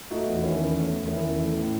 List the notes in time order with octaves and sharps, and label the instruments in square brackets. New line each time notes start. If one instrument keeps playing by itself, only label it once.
[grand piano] A3 D#4 F#4
E2
D#3 C#4 E4
E2
A3
E2
D#3 C#4 E4
E2
A3
A2